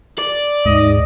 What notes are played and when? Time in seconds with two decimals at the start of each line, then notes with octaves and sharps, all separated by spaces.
0.18 D5
0.65 D#2 G#2 D#5